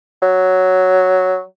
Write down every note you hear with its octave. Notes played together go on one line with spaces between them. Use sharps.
F#3